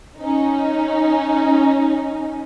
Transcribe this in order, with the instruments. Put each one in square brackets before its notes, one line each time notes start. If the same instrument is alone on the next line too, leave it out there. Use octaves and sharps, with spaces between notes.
[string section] C#4 D#4